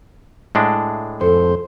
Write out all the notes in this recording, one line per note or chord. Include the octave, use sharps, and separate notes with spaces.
A2 G#3 D4
F2 A4 C5